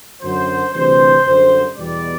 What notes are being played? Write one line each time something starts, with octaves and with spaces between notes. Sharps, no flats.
F#2 D3 F#3 C5
D2 C3 E3 G3 C5
F#2 D3 G3
E2 B2 G3 D5